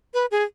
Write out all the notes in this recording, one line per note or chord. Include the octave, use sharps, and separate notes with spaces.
B4
G#4